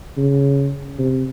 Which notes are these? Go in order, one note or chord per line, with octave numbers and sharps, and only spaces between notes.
C#3
C3